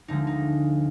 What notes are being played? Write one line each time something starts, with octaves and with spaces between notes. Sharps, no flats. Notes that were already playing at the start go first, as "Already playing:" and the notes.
D2 D3 F3 G#3 D#4
D#4